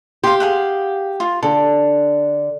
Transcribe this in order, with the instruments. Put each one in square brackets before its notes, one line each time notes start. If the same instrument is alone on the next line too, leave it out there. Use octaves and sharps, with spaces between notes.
[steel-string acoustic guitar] G4 [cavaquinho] F5 C6
[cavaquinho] G#4 F5 F#5
F4
[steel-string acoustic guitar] D3 [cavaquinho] A4